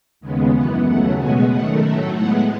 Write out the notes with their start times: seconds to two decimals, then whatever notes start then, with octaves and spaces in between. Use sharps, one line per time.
0.20 D#2 C#3 G#3 B3
0.53 F#2 E3 B3 F#5
0.85 D#2 C#3 F#3 A3 F#5
1.18 B2 G#3 B3 G#5
1.50 F#2 D#3 A3 F#5
1.82 A2 F#3 A3 E5
2.15 A2 G#3 B3 F#5